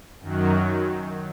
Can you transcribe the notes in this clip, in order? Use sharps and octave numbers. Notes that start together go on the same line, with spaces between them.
F#2 D#3 F#3